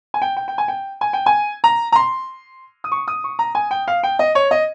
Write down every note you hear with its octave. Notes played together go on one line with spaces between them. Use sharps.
G#5
G5
G5
G5
G#5
G5
G#5
G5
G#5
A#5
A#5
C6
D#6
C#6
D#6
C#6
A#5
G#5
G5
F5
G5
D#5
C#5
D#5